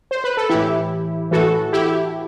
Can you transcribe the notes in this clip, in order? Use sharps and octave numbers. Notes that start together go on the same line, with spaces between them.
C5
B4
A4
A2 E3 E4 G4
A2 E3 F#4 A4
E4 G4